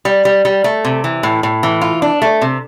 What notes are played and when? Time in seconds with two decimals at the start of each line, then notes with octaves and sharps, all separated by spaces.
0.05 G3
0.25 G3
0.45 G3
0.64 A3
0.85 C3
1.04 E3
1.23 A2
1.43 A2
1.63 E3
1.81 F4
2.02 D4
2.22 A3
2.42 C3